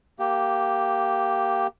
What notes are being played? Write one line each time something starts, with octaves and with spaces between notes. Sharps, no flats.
A#3 G4